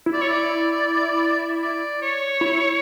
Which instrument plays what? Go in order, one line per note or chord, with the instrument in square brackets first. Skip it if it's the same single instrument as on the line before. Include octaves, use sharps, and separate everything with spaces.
[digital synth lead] E4
[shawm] D5
C#5
D5
D5
C#5
[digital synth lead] E4